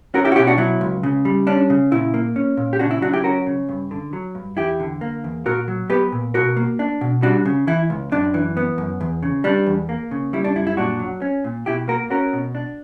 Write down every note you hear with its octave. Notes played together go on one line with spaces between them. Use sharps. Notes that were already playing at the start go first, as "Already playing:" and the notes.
C#4 F#4 A#4
E4 G4
F#4
B2 E4 G4
D4 F#4
F#3 E4
C#2
C#3
G3
C#4 D4
C#3
A#2 E4
A#3
C#4
A#2
G4
C#3 D4 F#4
E4
F#3 D4 F#4
E4 G4
C#4 F#4 A#4
C#3
G2
D3
F#3
G2
E2 E4 G4
D3
A#3
E2
A#2 F#4 A#4
F#3
B3 G4 B4
A#2
B2 F#4 A#4
A#3
D4
B2
G3 D4 F#4
C#3
E3 E4
C#2
F#2 D4
E3
B3
F#2
E2
C#3
G3 D4
E2
A#3
C#3
G3 E4
D4
F#2 E4
E4
A#2 D4 F#4
F#3
C#4
A#2
B2 E4 G4
A#3 F#4 A#4
C#4 F#4 A#4
B2
D4